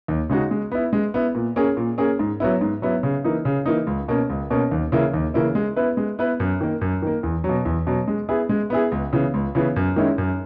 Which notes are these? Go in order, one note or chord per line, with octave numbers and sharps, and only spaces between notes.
D#2
C#3 G#3 D#4 F#4
G#3
B3 E4
G#3
B3 E4
A#2
A#3 C#4 G#4
A#2
A#3 C#4 G#4
G#2
F#3 B3 E4
G#2
F#3 B3 E4
C#3
E3 A#3 D#4
C#3
E3 A#3 D#4
C#2
B2 A#3 C#4
C#2
B2 A#3 C#4
D#2
C#3 E3 A#3 E4
D#2
C#3 E3 A#3 E4
G#3
B3 E4 B4
G#3
B3 E4 B4
F#2
D#3 A#3
F#2
D#3 A#3
E2
B2 F#3
E2
B2 F#3
G#3
B3 E4 G#4
G#3
B3 E4 G#4
C#2
C#3 E3 B3
C#2
C#3 E3 B3
F#2
D#3 G#3 C#4 E4
F#2